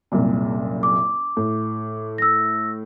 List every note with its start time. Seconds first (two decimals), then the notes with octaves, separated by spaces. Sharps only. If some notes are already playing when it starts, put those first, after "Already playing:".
0.12 F#1 C2 A#2
0.83 D6
1.37 A2
2.18 E6 A#6